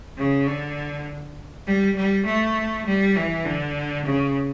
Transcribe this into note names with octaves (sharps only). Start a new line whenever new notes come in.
C#3
D3
G3
G3
A3
G3
E3
D3
C#3